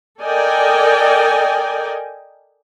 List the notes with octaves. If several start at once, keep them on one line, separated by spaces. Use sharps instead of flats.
A4 A#4 D5 D#5 G5 G#5